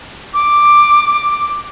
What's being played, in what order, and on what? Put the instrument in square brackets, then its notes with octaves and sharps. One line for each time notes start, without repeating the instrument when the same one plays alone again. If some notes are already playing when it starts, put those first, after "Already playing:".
[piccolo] D6